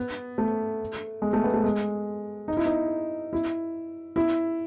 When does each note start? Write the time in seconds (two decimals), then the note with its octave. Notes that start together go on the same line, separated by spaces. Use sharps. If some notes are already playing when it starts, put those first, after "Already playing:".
Already playing: B3
0.38 A3
1.22 G#3
1.33 A3
1.44 B3
1.54 A3
1.64 G#3
2.48 D#4
2.57 E4
2.66 D#4
3.33 E4
4.16 E4